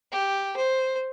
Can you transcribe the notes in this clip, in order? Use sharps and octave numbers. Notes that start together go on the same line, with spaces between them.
G4
C5